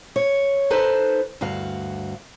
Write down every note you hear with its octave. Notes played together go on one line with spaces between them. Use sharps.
C#5
D#4 A4 B4 C5
D2 G2 F#4 F5